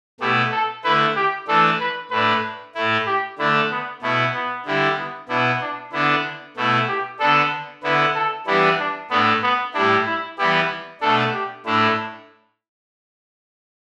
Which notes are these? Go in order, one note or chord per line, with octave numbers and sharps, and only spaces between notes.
B2 A3 E4 G4
A4
D3 A3 E4 B4
G4
E3 A3 D4 A4
B4
A2 A3 D4 B4
A2 A3 E4
G4
D3 A3 D4 E4
B3
B2 A3 B3 E4
B3
D3 G3 E4
B3
B2 B3 D4 E4
D4
D3 B3 D4 E4
B2 A3 E4
G4
D3 B3 D4 A4
D3 B3 E4 B4
A4
E3 G3 B3 D4 E4
D4
A2 A3 B3 D4
B3
A2 G3 D4 E4
E4
E3 G3 B3 E4 G4
B2 A3 D4 A4
G4
A2 A3 D4 E4